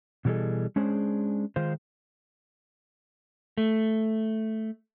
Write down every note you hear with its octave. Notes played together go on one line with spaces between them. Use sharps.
B2 E3 G3 G#4 A4 D#5
G#3 C#4 D4 G#4 C5
D#3 G#3 F4 C5
A3